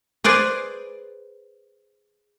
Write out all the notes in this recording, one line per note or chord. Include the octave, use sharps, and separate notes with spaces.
G#4 B4 C5 D5